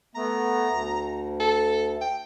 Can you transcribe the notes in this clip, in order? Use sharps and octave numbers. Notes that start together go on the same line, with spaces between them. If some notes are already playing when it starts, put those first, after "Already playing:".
A3 B3 A#5
D2
A4
G5